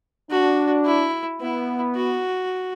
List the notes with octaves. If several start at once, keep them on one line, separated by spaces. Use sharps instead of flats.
D4 F#4
E4
B3 E4
F#4